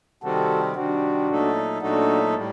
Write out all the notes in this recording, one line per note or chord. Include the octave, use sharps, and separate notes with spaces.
C3 D#3 G3 C4 F#4 A4
C3 D#3 G3 C4 D4 F#4
A#2 F#3 A3 D#4 A4
A#2 F#3 A3 D4 D#4 F#4 A4
A2 G3